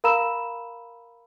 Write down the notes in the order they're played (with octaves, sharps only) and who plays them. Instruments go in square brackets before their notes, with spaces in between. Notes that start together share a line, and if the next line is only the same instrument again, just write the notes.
[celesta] A#4 F5 A#5 B5 E6 E7